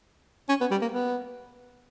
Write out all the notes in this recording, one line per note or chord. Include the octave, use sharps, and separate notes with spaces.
C#4
B3
G3
A#3
B3